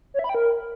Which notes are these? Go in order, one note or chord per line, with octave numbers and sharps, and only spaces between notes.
C#5
E5
B5
G5
A#4